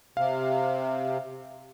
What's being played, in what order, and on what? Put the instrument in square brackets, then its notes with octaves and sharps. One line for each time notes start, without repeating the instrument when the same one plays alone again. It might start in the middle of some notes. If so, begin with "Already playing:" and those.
[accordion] C3 [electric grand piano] F5